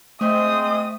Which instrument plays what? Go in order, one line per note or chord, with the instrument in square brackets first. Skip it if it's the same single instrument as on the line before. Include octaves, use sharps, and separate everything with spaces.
[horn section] G#3 C4 [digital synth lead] A3 [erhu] D#6